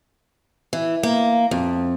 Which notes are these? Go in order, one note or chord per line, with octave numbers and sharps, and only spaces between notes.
E3
A#3
F2